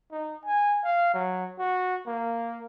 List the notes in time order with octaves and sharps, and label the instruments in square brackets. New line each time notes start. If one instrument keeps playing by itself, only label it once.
[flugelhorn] D#4
G#5
F5
F#3
F#4
A#3